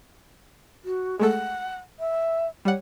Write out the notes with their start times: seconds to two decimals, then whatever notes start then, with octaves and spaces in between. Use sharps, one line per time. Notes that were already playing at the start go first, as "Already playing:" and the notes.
0.84 F#4
1.19 G#3 A3 A4 F#5
1.99 E5
2.65 G3 C#5 F#5